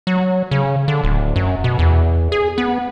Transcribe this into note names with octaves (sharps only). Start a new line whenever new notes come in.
F#3
C#3
D3
D1
F#2
B2
E2
G#4
B3